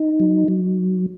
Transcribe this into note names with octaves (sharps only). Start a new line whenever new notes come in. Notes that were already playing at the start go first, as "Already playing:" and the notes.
Already playing: D#4
F#3
F#3